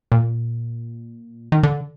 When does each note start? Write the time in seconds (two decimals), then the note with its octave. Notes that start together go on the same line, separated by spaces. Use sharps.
0.12 A#2
1.52 D#3
1.63 D3